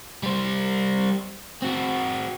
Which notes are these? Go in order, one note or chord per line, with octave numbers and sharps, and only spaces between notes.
G3 C5
C4 F#4